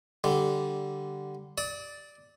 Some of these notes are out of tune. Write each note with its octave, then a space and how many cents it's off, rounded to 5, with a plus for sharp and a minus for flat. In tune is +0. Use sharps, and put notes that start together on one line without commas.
D3 +0 G3 -10
D5 +0 D#6 +45